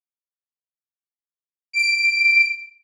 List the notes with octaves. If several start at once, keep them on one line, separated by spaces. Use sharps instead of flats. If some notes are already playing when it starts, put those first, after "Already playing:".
D7